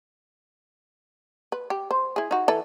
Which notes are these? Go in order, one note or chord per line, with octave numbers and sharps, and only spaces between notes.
B4
G4
C5
E4 G#4
D#4 F#4
E3 A4 B4